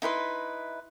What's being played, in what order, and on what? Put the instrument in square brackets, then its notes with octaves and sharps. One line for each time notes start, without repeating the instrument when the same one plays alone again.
[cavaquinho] D#4 E4 B4 C6